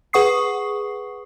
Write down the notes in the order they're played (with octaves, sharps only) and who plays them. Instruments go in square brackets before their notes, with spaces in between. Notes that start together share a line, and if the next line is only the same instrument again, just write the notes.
[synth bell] G#4 B4 F#5 C#6 D#6 C7